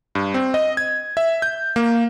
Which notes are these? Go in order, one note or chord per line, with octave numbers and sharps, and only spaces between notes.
G2
C4
D#5
G#6
E5
G6
A#3